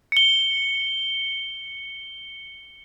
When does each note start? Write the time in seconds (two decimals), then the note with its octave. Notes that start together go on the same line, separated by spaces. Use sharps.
0.12 C#7 G7